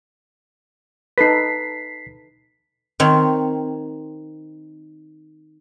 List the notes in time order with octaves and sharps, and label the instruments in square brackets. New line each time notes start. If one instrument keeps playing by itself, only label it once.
[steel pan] D#4 A4 B4 [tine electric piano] B6 C7
[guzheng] D#3 C4 C#5